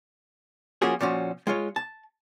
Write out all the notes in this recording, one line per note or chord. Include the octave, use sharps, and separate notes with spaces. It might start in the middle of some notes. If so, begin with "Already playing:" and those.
F3 A#3 C#4 F4 F#4 G#4
A#2 F3 C#4 F#4
G#3 F4 C#5
A5